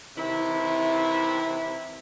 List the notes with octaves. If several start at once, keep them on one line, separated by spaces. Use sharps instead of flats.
C3 D#3 E3 E4